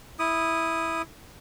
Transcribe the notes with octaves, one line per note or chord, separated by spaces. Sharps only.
E4 D#6